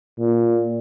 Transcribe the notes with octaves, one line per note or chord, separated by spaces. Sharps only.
A#2